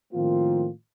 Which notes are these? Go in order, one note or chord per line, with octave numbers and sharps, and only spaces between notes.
A2 D#3 F3 A#3 C4 F4